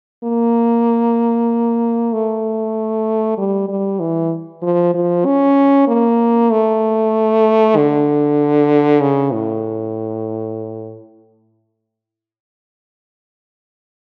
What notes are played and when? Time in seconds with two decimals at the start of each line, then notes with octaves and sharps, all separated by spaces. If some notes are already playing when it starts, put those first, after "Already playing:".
0.24 A#3
2.13 A3
3.38 G3
3.69 G3
4.00 E3
4.62 F3
4.94 F3
5.26 C#4
5.88 A#3
6.51 A3
7.77 D3
9.01 C#3
9.33 A2